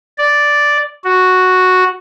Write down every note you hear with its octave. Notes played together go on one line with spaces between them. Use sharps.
D5
F#4